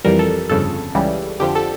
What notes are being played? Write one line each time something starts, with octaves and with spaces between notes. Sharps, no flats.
F2 E3 G3 A#4
A4
G1 F2 C#3 A4
C#2 C#3 E3 G3
F2 D3 F3 G4
A4